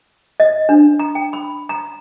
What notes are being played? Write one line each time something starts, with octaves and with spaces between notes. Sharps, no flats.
D#5
D4
A#5
G5
B5
A#5